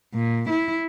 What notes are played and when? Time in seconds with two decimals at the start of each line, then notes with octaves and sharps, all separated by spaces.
0.15 A#2
0.49 E4